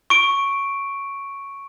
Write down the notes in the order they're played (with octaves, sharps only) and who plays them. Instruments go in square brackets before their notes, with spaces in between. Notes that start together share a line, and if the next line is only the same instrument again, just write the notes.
[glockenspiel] C#6 D7